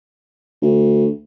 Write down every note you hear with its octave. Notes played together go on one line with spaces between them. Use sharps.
D2